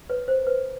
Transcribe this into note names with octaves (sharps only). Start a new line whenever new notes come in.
B4 C#5
C5
B4